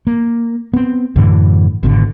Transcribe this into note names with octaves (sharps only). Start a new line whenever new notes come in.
A#3
B3 C4
F#2 A2 D3 E3
G#1 B2 D3